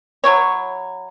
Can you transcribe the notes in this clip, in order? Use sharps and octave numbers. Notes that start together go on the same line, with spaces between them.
F#3 E4 C#5